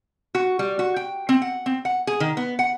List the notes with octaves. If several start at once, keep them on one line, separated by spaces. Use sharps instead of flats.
F#4
G3
F#4
G5
C4
F#5
C4
F#5
G#4
D#3
B3
F#5